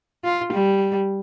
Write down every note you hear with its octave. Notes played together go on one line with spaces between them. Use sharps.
F4
G3